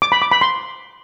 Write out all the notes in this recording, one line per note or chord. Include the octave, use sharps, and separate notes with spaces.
D6
B5
D6
B5
C6